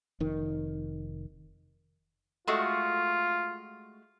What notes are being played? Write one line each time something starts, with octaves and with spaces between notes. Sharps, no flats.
F1 D#3
G#3 A3 F4 F#4